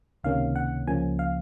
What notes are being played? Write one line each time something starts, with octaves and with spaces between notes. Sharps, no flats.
C#2 C3 D#3 A#3 C#4 F5
F#5
C#2 C#3 F3 A#3 C#4 G#5
F5